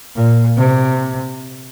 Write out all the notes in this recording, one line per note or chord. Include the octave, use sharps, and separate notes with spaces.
A#2
C3